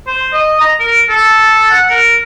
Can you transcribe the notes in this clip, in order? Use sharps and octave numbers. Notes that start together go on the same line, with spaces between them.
C5
D#5
A#5
A#4
A4
F#5
A#4